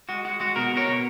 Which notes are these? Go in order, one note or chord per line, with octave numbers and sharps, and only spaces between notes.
G#3 F#4
G#3 F#4
G#3 F#4
B2 F#4 A#4
B2 A#4 C#5
B2